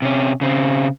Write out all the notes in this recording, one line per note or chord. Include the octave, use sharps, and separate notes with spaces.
C3 C#4
C#3 C4